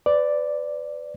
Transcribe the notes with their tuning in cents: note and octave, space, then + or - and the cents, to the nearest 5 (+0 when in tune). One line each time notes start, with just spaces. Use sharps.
B4 +35 D5 +0